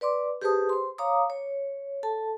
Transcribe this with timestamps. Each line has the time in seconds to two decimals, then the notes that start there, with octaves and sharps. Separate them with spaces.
0.01 B4 D5 C6 D6
0.41 G4 G#4 B4 C5 A5 D#6
0.69 C5 C6
0.98 C#5 F5 A#5 D6 D#6
1.30 C#5
2.03 A4 A5